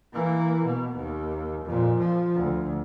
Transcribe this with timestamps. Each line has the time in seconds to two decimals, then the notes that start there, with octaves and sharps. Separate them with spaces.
0.14 E3 A#3
0.65 B2
0.97 D#2
1.66 F2 A#2
1.99 F3
2.36 D2